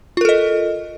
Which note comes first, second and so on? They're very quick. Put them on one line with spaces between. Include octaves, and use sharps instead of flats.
F4 A#4 A4 D#5